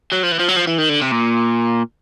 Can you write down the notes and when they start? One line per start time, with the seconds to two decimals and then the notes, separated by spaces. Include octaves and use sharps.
0.12 F#3
0.23 F3
0.32 E3
0.39 F3
0.48 F#3
0.56 F3
0.67 E3
0.78 D#3
0.89 D3
1.02 C3
1.12 A#2